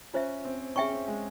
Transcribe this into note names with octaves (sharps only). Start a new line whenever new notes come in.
C#4 F4 C5 E5
C4
C#4 G#4 E5 G5 C#6
C4
G#3